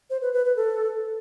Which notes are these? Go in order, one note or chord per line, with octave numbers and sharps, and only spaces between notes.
C5
B4
B4
B4
A4